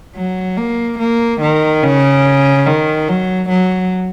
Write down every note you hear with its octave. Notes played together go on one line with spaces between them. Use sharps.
F#3
A#3
A#3
D#3
C#3
D#3
F#3
F#3